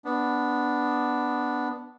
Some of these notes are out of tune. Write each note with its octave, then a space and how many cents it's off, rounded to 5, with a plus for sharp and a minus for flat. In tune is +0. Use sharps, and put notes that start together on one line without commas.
B3 +0 D4 +0